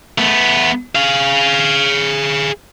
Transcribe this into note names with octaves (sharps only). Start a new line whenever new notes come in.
A3 B3
G#4 F5